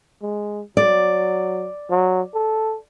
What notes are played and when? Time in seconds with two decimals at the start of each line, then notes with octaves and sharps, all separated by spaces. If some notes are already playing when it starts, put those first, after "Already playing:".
0.22 G#3
0.77 F#3 D5
1.90 F#3
2.34 A4